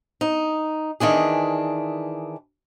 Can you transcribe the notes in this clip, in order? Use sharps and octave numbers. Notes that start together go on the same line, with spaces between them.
D#4
D#3 E3 D4 G#4